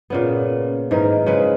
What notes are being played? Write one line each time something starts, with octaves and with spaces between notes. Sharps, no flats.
A#2 C#3 B3
G#2 D#3 E3 A#4
C#3 G#3 B4